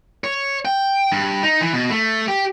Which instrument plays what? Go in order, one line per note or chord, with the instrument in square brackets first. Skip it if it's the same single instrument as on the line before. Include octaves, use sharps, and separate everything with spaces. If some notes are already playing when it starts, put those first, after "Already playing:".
[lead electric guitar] C#5
G5
G2
D#4
E3
B2
A3
G4